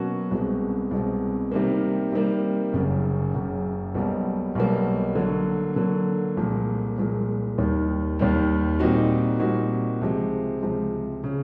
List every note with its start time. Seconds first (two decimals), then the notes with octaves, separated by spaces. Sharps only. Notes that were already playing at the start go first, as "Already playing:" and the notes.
Already playing: B2 F#3 A#3 C#4 F#4
0.31 C2 B2 G#3 C4
0.91 C2 B2 G#3 C4
1.52 C3 D#3 G3 A#3
2.12 C3 D#3 G3 A#3
2.73 F#1 F#2 C#3
3.34 F#1 F#2 C#3
3.94 B1 B2 G3 A#3
4.55 B1 B2 G3 A#3
5.15 D3 F#3 A#3
5.76 D3 F#3 A#3
6.37 C2 A#2 F3 G#3
6.98 C2 A#2 F3 G#3
7.58 D#2 D#3 G3
8.19 D#2 D#3 G3
8.79 A#2 G3 C4 D#4 F#4
9.40 A#2 G3 C4 D#4 F#4
10.01 C#2 C3 F3 G#3
10.62 C#2 C3 F3 G#3
11.24 C#3